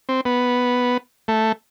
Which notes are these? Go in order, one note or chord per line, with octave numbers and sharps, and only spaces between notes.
C4
B3
A3